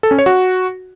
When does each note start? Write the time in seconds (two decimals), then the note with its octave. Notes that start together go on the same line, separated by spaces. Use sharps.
0.03 A4
0.11 C#4
0.19 C#5
0.26 F#4